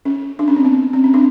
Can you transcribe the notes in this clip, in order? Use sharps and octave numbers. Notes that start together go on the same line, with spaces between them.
C#4
D4
C#4
C4
B3
C4
C#4
C4 D4